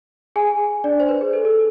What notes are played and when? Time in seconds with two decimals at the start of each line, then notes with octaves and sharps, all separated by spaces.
0.36 G#4 G#5
0.84 D4 D5
1.00 C5
1.09 B4
1.21 G#4
1.33 A4
1.45 A4